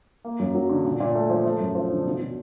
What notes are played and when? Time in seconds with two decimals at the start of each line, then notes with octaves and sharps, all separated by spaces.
0.25 A#3
0.39 F#2
0.55 F#3
0.69 D3
0.85 A#2
1.00 A#2
1.15 A3
1.30 F3
1.46 A3
1.60 F#2
1.75 F3
1.90 D3
2.06 B2
2.20 B2